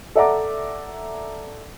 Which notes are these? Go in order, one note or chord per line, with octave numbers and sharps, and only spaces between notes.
A4 D5 E5 F#5 A#5 D6